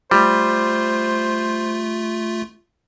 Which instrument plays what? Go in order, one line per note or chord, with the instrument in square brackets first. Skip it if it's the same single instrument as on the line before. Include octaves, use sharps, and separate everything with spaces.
[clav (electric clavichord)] G3 [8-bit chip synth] A3 F4 [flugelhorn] C5